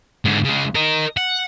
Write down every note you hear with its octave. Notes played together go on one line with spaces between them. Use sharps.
G#2 D3
C#3 G#3
A#4 D#5
F#5